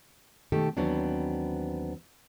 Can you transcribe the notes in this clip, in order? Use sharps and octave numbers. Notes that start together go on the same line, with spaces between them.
B2 D#3 A3 G4 A4
D#2 E3 F#3 B3 C4 D4